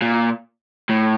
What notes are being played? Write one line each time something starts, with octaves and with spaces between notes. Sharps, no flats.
A#2
A2